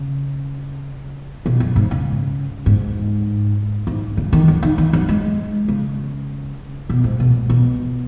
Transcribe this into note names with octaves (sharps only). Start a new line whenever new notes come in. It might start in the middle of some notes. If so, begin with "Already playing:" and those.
Already playing: C#3
B2
F#2
G#2
C#3
G#2
G#2
C#3
D#3
F#3
D#3
D#3
F#3
G#3
C#3
B2
G#2
B2
B2